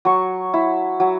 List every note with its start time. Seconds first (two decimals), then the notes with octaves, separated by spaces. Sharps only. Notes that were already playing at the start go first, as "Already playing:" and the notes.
0.05 F#3 C#6
0.54 E4
1.00 F#3